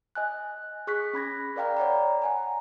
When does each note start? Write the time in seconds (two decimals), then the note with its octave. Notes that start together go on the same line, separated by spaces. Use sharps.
0.15 D#5 G#5 F#6
0.87 G#4 C#6 F#6 B6
1.13 C#4 B5 G#6 A#6
1.56 A#4 D5 F5 G5 A#5 B5
1.77 C#5 D5 F#5 A#5
2.22 F#5 G#5 A#5